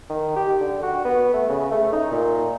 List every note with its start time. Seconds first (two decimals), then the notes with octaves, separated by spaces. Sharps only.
0.10 D#3
0.36 G4
0.61 D3
0.83 F#4
1.05 B3
1.34 A3
1.50 C#3
1.72 A3
1.93 D#4
2.11 A#2